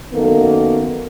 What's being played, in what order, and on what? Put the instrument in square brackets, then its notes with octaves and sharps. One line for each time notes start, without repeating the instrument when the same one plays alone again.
[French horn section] F#2 D#3 A#3 B3 A4